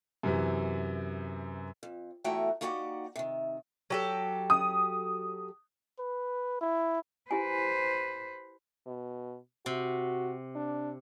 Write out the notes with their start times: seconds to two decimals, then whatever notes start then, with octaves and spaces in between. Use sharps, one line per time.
0.23 F#2 C3 E3
1.83 F2
2.24 E2 A3 E4 F#4 G5 A#5
2.61 A#3 D#4 F#4 G4 D5 F#5
3.16 C3 D#3
3.90 F#3 G4 A4
4.50 D#6
5.99 B4
6.61 E4
7.31 E4 G4 B4 C5 G#5
8.86 B2
9.66 C3 F#4
10.55 D4